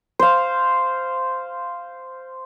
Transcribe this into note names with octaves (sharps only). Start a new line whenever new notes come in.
C5 F5